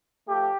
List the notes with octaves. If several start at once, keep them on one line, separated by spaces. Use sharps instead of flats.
F3 A3 G4